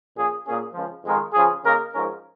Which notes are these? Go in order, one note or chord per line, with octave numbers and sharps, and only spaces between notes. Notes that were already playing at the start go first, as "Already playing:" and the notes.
A#2 F3 C#4 G#4
A#2 A#3 C#4 G#4
C#2 C#3 F3
F2 D#3 G#3 F4 A#4
C#3 F3 C#4 G#4
C#3 A#3 D#4 A#4
G#2 F3 C#4 A#4